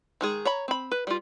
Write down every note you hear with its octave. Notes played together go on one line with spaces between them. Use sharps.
D#3 G#3 G#4
C#5 A#5 B5
C4 B5
B4
G3 F4